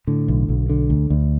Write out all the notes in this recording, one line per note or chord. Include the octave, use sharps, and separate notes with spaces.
A2 D3
B1
B1
D3
D2
D2